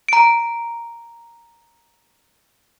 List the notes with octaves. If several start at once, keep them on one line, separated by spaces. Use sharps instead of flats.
A#5 D7